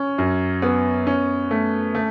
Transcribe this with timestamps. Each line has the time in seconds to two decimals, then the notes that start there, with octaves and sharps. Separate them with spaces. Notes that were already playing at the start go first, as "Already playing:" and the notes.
Already playing: C#4
0.18 F#2
0.62 B3
1.07 C#4
1.51 A3
1.95 A3